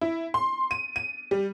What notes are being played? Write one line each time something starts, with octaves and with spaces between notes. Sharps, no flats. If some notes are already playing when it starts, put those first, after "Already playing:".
E4
C6
D#7
D#7
G3